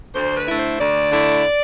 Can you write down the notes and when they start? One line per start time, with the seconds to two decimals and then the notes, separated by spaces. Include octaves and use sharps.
0.14 D2 C5
0.36 B4
0.48 D3 A3 E4
0.58 C5
0.79 D2 D5
1.11 D3 A3 E4